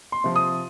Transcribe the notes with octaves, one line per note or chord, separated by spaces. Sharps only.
C6
C3 F3
D#6